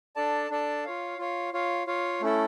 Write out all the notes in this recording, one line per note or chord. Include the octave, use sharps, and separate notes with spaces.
D4 A4 D5 A5
D4 A4 D5 A5
F4 C#5 F5
F4 C#5 F5
F4 C#5 F5
F4 C#5 F5
A3 C#4 E4 A4